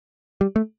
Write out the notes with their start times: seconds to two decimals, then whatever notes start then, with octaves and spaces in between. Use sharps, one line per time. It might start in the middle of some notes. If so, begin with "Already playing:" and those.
0.41 G3
0.56 A3